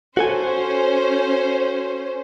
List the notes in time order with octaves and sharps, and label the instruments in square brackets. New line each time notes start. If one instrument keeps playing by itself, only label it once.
[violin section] C#4 C5 [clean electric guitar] F#4 A4 G#5